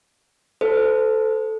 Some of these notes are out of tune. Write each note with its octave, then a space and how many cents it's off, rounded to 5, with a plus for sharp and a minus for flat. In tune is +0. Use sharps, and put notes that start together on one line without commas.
A4 +0 C5 -35